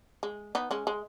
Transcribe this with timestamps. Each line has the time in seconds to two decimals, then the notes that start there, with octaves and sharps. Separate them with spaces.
0.23 G#3
0.55 B3 D#4
0.71 G#3 C#4
0.87 G#3